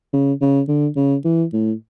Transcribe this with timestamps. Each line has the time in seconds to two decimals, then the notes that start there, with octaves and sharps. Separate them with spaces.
0.13 C#3
0.41 C#3
0.68 D3
0.96 C#3
1.25 E3
1.53 A2